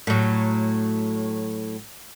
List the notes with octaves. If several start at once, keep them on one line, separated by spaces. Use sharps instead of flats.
A2 F#3